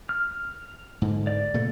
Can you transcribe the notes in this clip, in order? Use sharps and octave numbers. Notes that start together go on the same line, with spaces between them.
F6
G#2 D3
D5
A#2 C#3 A3